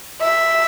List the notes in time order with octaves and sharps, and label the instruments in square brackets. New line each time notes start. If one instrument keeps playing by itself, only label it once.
[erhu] E5